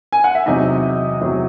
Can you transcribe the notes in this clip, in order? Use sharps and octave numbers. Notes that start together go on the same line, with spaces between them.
G#5
F#5
E5
E2 C3 F#3 D#4 D#5
E2 C3 F#3